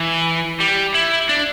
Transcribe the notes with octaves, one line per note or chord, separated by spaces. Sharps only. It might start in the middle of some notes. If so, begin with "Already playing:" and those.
Already playing: E3
G3
E4
D4